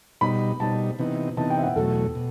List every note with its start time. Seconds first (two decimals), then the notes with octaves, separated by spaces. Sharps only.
0.21 B2 G3 D#4 B5
0.60 B2 G3 D#4 A5
0.99 C3 E3 B3 D#4
1.37 C3 E3 B3 D#4 A5
1.50 G5
1.59 E5
1.63 F#5
1.76 E2 B2 F#3 A3 A4
2.15 B2